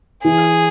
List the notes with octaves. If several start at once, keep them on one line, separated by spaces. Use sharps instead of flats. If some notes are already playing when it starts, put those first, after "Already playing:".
E3 G#4